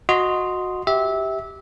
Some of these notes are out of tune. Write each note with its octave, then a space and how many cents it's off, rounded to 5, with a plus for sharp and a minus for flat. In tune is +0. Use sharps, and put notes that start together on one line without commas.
F#4 -15 D#5 +0 C6 -5
G4 +0 E5 -20